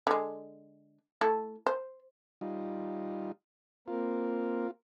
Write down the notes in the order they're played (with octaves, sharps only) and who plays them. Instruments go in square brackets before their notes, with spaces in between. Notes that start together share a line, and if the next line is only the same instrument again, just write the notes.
[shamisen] D3 G#3
A3 E4 A4
C5
[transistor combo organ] G3 D#4 F4
[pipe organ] A#3 C4 A#4 [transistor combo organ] F4